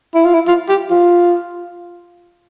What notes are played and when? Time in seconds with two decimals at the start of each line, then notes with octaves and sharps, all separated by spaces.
0.15 E4
0.25 F4
0.34 E4
0.47 F4
0.69 G4
0.90 F4